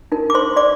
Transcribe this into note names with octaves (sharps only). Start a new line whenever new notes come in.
D#4 A#4
D6
C5 C6
D5 D6